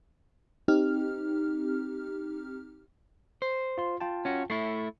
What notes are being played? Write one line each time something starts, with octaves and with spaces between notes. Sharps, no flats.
C4 D#4 G4 F6
C5
F4 C6
F4 G5 A5
C#4 F#4
A3 E4 C#6 C7